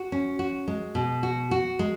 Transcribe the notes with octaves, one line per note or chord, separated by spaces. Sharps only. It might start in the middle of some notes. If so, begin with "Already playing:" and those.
Already playing: F#4
C#4
F#4
G#3
B2
F#4
F#4
G#3